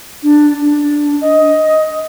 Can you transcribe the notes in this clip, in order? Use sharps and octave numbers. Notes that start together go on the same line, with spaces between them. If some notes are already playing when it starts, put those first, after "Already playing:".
D4
D4
D#5